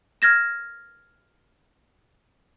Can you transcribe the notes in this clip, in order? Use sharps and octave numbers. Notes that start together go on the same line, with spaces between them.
F6 G#6 A#6 E7